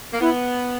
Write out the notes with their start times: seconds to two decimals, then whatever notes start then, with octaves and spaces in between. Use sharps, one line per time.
0.12 A#3
0.20 B3 E4